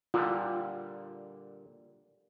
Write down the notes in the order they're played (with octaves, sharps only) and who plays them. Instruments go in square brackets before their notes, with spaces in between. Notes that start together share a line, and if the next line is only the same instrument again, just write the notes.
[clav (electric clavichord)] A#2 D3 G3 [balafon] F4